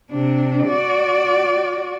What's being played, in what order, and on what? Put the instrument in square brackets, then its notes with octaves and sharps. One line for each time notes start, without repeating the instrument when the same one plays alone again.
[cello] C3 D4
F#4 D5